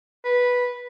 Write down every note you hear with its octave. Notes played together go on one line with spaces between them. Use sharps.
B4